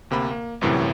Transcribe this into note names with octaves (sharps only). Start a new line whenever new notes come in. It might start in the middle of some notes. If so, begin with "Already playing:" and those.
D2 C3 A#3 B5
A#3
G1 C2 F#2 A2 C3 E3